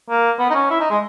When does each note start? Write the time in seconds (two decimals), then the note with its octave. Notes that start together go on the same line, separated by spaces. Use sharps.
0.09 A#3
0.39 B3
0.50 D#4
0.55 C#4
0.70 E4
0.80 D#4
0.90 G#3